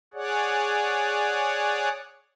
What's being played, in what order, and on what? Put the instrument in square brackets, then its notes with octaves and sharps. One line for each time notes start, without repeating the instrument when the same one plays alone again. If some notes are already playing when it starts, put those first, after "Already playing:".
[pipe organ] G#4 C#5 D5 F#5